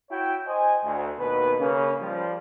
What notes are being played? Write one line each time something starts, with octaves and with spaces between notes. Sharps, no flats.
E4 F#4 C#5 G5
C5 D#5 G#5
D2
D#2 B2 B4
C#3 A#3 C#4
F3 G3